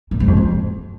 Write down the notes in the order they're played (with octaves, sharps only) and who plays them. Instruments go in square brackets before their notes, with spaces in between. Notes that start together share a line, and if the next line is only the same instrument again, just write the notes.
[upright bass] A#2
G#2
F2
G#2